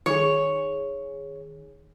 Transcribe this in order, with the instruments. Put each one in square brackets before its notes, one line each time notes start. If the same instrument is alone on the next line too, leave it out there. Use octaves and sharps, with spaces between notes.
[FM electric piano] D#3 G#4 [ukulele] C#5